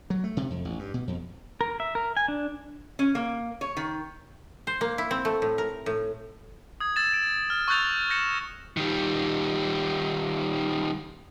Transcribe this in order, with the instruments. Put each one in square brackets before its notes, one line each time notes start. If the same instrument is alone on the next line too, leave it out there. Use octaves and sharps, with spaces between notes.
[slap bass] F#3
A3
C3
F2
A1
G2
B2
F2
[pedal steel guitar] A#4
E5
A#4
G#5
D4
[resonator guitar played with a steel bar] C#4
A#3
C#5
D#3
[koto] C5
A#3
E4
C4
A3
A2
A#4
A2
[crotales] D#6 G#6
E6 G#6 A6 E7
D7
F6
C#6 E6 F#6 G6 A6 F7
G6 A#6 C#7 E7
[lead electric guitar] D#3 G3